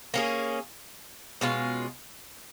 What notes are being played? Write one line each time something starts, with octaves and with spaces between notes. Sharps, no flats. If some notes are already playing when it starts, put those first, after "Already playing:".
A#3 C#4 G#4
B2 G#3 C#4 F4